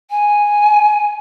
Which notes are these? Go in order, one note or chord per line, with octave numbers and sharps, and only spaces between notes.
G#5